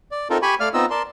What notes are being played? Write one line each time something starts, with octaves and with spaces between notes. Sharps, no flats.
D5
C4 D#4 F4 A4 A#4
G4 G#5 B5 C#6
A3 D5 F5 F6
B3 C4 D#4 F4 D#5 E6
A#4 D5 A5 C6